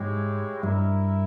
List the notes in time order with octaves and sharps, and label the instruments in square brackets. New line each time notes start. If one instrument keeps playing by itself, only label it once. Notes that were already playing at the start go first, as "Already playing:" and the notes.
Already playing: [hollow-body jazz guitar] G#2 [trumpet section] G#3 E4 G4 C#5
[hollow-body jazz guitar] G2 [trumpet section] E4 A#4 E5